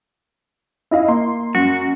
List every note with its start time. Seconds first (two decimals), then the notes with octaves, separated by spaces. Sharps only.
0.91 E4 D#5 F5
1.08 A#3 C6
1.55 F#2 F#4